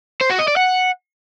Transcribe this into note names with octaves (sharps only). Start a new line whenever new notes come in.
C5
F#4
D#5
D5
F#5